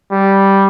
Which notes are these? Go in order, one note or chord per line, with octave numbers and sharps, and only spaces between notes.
G3